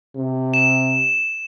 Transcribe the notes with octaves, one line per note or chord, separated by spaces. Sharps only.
C3
E7